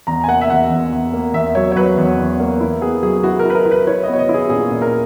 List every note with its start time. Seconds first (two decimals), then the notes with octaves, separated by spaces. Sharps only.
0.07 E2 A#5
0.24 G#5
0.28 A#3 F#5
0.41 E5
0.50 E2 F#5
0.70 E2
0.92 E2
1.13 A#3
1.34 E2 E5
1.55 F#3 C#5
1.72 C#5
1.76 F#3 B4
1.98 E2
2.18 E2
2.40 A#3
2.60 E4
2.81 B3 G#4
3.03 F#3 G#4
3.23 E4 F#4
3.39 A#4
3.45 E4 B4
3.55 A#4
3.66 E4
3.71 B4
3.87 E4 C#5
4.03 B3 D#5
4.14 C#5
4.19 D#5
4.29 E4
4.34 G#4
4.50 A#2 G#4
4.71 A#2
4.82 A#4